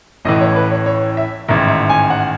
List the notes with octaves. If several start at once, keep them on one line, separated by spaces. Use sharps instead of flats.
A1 A2 E3 D#5
C#5
B4
C#5
C#5
E5
A1 G#2 D#3 E5
E5
G#5
F#5